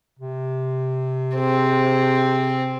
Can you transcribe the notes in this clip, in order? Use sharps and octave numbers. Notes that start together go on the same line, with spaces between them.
C3
C4 G#4 C5